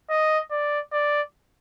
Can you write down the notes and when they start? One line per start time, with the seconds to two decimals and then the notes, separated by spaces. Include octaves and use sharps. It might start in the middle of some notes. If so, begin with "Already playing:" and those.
0.10 D#5
0.51 D5
0.93 D5